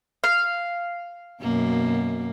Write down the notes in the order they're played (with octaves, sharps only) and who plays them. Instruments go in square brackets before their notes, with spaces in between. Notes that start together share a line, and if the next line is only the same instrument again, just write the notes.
[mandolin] F5
[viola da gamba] F#2 B2 A#3